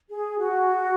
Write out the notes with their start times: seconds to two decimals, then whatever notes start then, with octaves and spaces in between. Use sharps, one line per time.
0.09 G#4
0.39 F#4